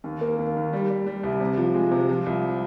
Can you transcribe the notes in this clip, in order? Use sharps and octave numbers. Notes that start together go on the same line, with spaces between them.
D#2
A#3
D#2
D#2
G3
G3
G3
C2
C3
F3
G#3
C3
F3
C2